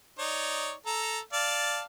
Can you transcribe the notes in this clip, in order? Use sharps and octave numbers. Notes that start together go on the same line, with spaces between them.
D#4 C#5 D5
A4 A#5
D5 F5 A5